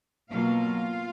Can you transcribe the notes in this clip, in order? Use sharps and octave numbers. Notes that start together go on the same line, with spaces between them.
B2 F#3 A#3 F4 F5